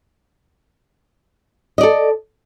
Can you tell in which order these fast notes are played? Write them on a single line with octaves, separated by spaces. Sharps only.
D#5 D5 A4